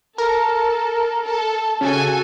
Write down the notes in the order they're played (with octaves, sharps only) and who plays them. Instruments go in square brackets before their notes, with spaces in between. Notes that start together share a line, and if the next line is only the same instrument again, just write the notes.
[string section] A4 [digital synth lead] A#4
[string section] A4
[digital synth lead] C#3 [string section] F#4 A4 G#5